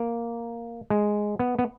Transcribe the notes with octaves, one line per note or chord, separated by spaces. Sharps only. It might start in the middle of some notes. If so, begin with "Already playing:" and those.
Already playing: A#3
G#3
B3
B3